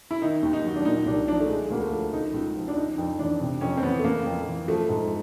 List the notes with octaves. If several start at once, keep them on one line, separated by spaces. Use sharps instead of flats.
E4
D#3 D#4
D#2
D#4
F#3
D4
A#2 D#4
C2 D4
F3 D4
A3
D3 G#3
D2 A#3
A3
F3
C#3 D#4
C#2
F3
D4
C#3 D#4
F2
E3 D4
C3
F2 C#4
C4
E3 B3
A3
C#3 A#3
F2
E3
F3 A3
G#2